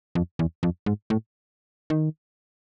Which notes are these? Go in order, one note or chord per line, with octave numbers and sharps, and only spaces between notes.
F2
E2
F2
G#2
A2
D#3